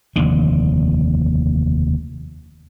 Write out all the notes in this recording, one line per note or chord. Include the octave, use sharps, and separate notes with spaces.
F1 D#2 D3